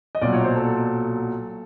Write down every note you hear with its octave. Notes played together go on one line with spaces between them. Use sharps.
D#5
B1 A#2 F#3 D5
C#5
C5
A4